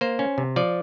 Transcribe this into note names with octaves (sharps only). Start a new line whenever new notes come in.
A#3 C5
C#4
C3
F3 D5